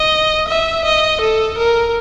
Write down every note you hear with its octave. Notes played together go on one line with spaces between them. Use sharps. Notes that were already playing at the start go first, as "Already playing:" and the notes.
Already playing: D#5
E5
D#5
A4
A#4